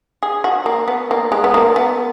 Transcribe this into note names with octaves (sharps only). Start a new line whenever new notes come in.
G#4
F#4
A#3
B3
A#3
G#3
B3
A#3
B3